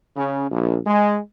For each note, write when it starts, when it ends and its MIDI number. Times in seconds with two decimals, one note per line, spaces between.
0.16 0.46 49
0.51 0.78 34
0.87 1.18 56